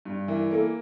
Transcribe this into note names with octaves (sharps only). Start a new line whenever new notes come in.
G2
E3 A#4
A#3 A4